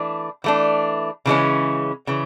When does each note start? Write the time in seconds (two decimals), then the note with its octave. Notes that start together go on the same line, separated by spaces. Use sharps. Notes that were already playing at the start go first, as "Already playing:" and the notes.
Already playing: E3 A3 D4
0.44 E3 A3 D4
1.26 C#3 E3 G#3 C#4
2.07 C#3 E3